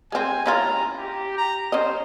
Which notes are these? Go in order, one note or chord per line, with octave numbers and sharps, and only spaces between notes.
G#3 C4 G#5
C#4 E4 F4 A#5
G4
A#5
C#4 C5 D#5